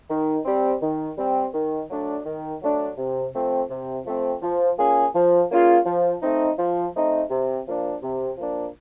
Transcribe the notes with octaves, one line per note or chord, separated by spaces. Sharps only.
D#3
G3 C4
D#3
G3 C4
D#3
F#3 A3 D4
D#3
F#3 A3 D4
C3
F3 A3 C4
C3
F3 A3 C4
F3
A#3 C#4 F4 G#4
F3
A#3 C#4 F4 G#4
F3
A3 C4 D#4
F3
A3 C4 D#4
C3
F3 A#3 D4
C3
F3 A#3 D4